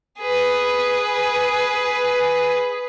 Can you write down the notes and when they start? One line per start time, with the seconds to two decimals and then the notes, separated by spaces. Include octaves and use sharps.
0.20 G#4 B4